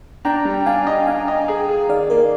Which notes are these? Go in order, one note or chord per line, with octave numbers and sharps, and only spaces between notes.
D4 G5 A#5
G3
D4 F5 G#5
D#5
D4 F5 G#5
D#5
G#4
G#4
D#3 D5 F5
A#3 A#4 D5